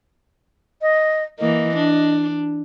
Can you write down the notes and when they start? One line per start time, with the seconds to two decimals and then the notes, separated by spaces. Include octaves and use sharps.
0.82 D#5
1.39 E3 A#3 D#5
1.76 D4